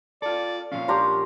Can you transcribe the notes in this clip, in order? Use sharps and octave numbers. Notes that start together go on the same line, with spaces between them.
F4 A4 D5
A#2 F3 C#4 F5
D4 G4 A#4 A#5 C6